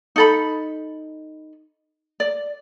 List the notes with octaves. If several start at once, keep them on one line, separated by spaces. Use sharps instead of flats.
D#4 A4 B5
D5